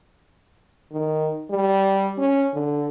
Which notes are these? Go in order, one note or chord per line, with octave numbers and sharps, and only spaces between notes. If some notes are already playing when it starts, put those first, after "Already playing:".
D#3
G3
C#4
D3